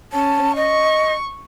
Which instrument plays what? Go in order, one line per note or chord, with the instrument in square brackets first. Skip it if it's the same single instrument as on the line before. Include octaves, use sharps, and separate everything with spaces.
[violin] C#4 [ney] A5
[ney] D#5 [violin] C#6